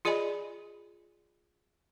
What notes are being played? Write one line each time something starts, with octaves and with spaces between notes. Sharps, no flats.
F4 G#4 D5 D#5 G#5 B5